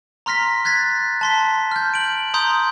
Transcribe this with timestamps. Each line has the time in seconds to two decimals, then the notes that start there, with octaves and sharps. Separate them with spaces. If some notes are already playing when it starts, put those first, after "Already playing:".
0.26 A#5 C6 F6 A#6 B6
0.65 F#6 G#6 A6 B6
1.21 A5 C6 B6
1.71 F6 G6
1.94 D7 F#7
2.34 A#5 C6 D#6 G6